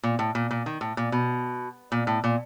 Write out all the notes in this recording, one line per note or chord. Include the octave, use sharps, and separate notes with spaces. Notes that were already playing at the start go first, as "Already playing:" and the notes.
A#2
A2
A#2
A#2
D#3
A2
A#2
B2
A#2
A2
A#2